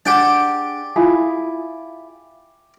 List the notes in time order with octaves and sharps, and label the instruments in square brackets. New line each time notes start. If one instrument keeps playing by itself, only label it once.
[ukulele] D4 G#4 F#5 [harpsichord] G4 G5 A5
[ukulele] E4 F4 G#4